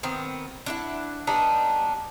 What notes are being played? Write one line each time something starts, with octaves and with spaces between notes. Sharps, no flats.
D#3 B3 C4
D4 E4 F#5
G3 B3 D4 D#4